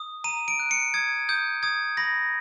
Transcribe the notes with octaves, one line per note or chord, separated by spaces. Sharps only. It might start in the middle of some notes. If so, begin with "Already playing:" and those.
Already playing: D#6
A#5 D#7
D7
F#6
C#7
D#6 G#6
D#6 G6
D#6 G#6
B5 A#6